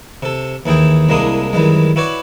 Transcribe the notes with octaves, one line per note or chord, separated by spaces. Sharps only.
C3 A4
D#2 E3 E4 G#4 G5
C2 G#3 A#3 D4 E4 D#6
F#2 D#3 E3 G3 G#3
E4 F#4 B4 C#5 D5